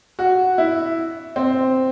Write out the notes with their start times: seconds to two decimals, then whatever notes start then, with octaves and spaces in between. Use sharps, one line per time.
0.19 F#4
0.58 E4
1.36 C4